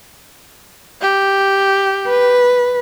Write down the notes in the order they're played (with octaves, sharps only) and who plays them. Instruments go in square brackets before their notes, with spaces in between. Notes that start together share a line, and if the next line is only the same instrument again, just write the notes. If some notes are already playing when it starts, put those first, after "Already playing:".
[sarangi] G4
[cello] B4